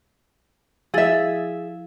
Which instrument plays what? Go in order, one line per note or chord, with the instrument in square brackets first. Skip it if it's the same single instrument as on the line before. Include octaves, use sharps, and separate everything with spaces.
[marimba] F3 E4 A6 [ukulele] G#4 E5